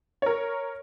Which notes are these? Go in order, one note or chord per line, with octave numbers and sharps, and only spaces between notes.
A#4 C#5